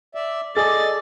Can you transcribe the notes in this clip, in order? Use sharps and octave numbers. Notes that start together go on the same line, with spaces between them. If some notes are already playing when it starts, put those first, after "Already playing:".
D5 E5
G#4 A4 D5 D#5 A6